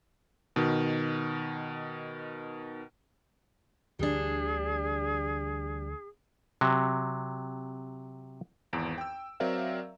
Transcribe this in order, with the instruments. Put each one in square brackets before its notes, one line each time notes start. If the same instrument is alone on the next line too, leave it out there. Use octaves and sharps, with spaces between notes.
[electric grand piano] B2 D#3
[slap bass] D2 D3 E3 [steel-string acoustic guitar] G3 D4 [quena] G#4
[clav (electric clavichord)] C3 F#3
[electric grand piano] G#1 E2 D7
G5 E6
F#3 C4 A#4 D5 E5 F5